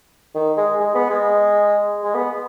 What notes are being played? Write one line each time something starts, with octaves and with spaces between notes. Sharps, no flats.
D#3
G#3
G#3
B3
G#3
G#3
B3